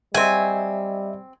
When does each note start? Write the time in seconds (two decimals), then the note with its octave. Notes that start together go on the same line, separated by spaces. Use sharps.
0.14 F#3 G3 C4 D#5 E5 G#5